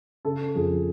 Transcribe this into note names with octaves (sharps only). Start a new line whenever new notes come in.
C#3 A4
F2 G#4